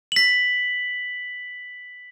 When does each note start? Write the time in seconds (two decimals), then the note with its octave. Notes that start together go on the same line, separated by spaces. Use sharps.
0.12 B6 F#7